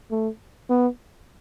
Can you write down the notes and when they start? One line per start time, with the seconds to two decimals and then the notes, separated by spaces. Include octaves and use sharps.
0.11 A3
0.70 B3